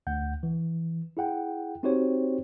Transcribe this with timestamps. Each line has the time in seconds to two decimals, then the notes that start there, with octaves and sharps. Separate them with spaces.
0.07 D2 F#5 G6
0.43 E3
1.17 E4 G#4 F#5 G5
1.83 C4 D#4 F#4 G4 C5 C#5